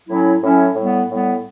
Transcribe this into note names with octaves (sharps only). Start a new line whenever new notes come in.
A2 F#3 C#4 E4
A2 F#3 C#4 E4
A2 G3 B3
A2 G3 B3